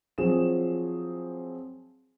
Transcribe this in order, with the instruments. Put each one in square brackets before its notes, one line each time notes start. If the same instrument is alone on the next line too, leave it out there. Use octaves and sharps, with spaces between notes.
[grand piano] F3 F#3 C4 G#4 E7